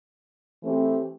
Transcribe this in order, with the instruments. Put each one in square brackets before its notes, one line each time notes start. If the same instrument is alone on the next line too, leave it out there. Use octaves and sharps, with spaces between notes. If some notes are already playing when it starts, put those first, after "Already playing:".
[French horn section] E3 A3 C4 G4